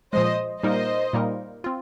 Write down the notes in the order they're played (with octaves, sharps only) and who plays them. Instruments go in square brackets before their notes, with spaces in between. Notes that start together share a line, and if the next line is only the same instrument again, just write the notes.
[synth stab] A#2 F3 G#3 [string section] C5 D#5
[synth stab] A#2 G3 A#3 D#4 A#4 [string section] C5 D#5
[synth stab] A#2 G3 A#3 D#4 A#4
C4 F4